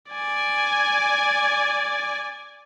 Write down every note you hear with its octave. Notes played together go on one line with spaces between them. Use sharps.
D5 G#5